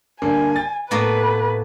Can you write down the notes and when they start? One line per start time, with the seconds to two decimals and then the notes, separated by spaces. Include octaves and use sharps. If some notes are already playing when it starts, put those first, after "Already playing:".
0.22 G2 D3 A#3 G#5
0.56 A6
0.91 A2 A#3 B3 B4